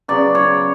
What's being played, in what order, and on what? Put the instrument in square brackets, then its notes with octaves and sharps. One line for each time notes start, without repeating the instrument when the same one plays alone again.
[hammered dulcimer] C#3 F#3 B3 D5
C#5